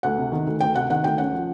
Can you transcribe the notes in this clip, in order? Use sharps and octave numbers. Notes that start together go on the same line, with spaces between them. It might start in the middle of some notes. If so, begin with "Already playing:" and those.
D2 F#5
C3
D#3
D2
D2 G5
C3 F#5
D#3 F#5
D2 G5
C#4 F#5
F3